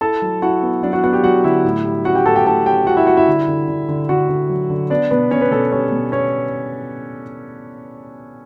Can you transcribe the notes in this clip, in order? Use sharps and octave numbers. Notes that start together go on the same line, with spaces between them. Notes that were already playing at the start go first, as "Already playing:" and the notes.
E4 A4 A5
F#3
E4 F#4 F#5
B3
F#3 D4 D5
F#4 F#5
B3 F#4 F#5
G4 G5
F#3 F#4 F#5
D3 E4 E5
A2
G3
C#4 F#4 F#5
G4 G5
A2 A4 A5
G4 G5
A2 A4 A5
C#4 G4 G5
G3 F#4 F#5
E4 E5
G3 F#4 F#5
E4 E5
D3
D3
D3
D3
D3 F#4 F#5
D3
F#3
D3
B3 D4 D5
B2 B3 B4
B2 C#4 C#5
B3 B4
B2 A4
G3 C#4 C#5
B2
B3 C#4 C#5